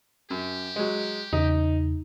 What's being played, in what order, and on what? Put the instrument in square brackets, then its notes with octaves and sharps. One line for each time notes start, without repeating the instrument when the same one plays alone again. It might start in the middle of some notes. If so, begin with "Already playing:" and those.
[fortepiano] F#2 [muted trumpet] G4
[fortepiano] F#3 G#3
[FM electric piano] E2 C#3 [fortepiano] D#4